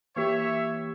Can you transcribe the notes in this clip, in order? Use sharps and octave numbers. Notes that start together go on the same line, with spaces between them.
E3 A#3 G4 C#5 E5